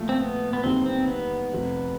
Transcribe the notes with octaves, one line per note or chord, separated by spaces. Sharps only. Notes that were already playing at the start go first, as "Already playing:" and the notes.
Already playing: A#2 F3 A3
C4
B3
B3
D#2 D3 G3 B3 C4 D#4
C4
B3
F1 F2 C3